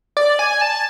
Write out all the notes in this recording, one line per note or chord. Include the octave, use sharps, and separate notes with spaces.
D5
G#5
A5